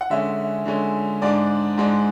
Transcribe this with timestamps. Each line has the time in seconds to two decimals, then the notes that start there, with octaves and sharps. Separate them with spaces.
0.01 F#5
0.10 D3 G#3 C#4 E5
0.66 D3 G#3 C#4
1.22 G#2 G#3 D4 D5
1.78 G#2 G#3 D4